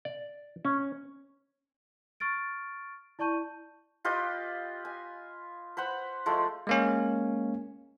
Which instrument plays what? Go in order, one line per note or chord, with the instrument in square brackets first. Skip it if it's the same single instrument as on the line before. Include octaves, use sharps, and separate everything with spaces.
[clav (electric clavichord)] D5
C#4
[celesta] C#6 F6 A6 D7
E4 D5 A5 C#6 G6 D#7
[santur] F4 G4 B4 D#5
G#5
B4 C5 F#5 B5
F3 G#3 A3
[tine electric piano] G#3 A#3 C#4